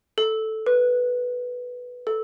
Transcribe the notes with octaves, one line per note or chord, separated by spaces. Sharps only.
A4
B4
A4